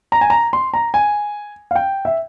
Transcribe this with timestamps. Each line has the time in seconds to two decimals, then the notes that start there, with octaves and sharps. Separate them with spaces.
0.12 A#5
0.21 G#5
0.30 A#5
0.53 C6
0.74 A#5
0.94 G#5
1.71 F5
1.76 G5
2.05 E5